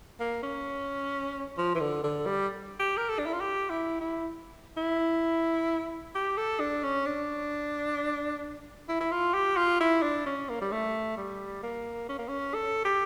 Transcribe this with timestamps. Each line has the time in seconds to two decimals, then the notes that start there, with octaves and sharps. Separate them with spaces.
0.20 A#3
0.43 C#4
1.58 F3
1.75 E3
1.80 D3
2.04 D3
2.26 G3
2.80 G4
2.97 A#4
3.09 A4
3.19 D4
3.26 E4
3.33 F4
3.41 G4
3.70 E4
4.01 E4
4.77 E4
6.15 G4
6.37 A4
6.60 D4
6.84 C#4
7.06 D4
8.89 E4
9.01 E4
9.12 F4
9.34 G4
9.57 F4
9.80 E4
10.03 D4
10.26 C#4
10.49 A#3
10.61 G3
10.71 A3
11.17 G3
11.63 A#3
12.09 C#4
12.19 A#3
12.29 C#4
12.54 A4
12.85 G4